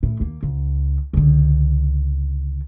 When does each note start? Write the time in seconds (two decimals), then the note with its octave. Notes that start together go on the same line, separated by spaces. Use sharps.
0.03 A2 E3
0.20 D#2 A#3
0.43 C#2
1.13 C#2 D3